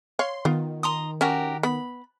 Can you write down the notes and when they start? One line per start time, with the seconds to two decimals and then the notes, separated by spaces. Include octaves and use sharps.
0.19 C#5 F5 C6
0.45 D#3 B3 F4
0.83 A#5 C6 D#6
1.21 C#4 F#4 G4 A#4
1.63 B3 B5